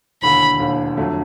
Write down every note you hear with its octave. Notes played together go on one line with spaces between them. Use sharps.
E1 D#2 D3 B5
E1 D#2 D3
F2 D3 F#3 A3